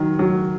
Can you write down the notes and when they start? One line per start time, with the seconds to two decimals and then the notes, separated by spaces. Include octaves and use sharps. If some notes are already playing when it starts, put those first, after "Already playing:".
Already playing: D#3 F#3
0.19 F#3